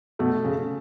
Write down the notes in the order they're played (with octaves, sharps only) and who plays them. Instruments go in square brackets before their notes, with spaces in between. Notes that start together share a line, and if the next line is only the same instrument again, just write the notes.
[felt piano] B2 [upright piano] A3
[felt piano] C#3